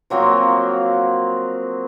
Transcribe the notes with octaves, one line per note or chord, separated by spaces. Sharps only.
F3 F#3 A#3 C4